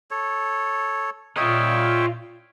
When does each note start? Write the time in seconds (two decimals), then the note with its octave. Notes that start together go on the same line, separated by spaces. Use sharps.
0.11 A4 C#5
1.37 A#2 F4 C#5 D#5 E5 G5